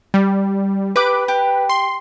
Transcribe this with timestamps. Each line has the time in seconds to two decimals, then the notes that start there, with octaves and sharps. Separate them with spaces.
0.14 G3
0.96 G4 B4 D6
1.28 G4
1.69 C6